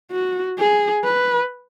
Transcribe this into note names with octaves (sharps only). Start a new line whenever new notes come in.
F#4
G#4
B4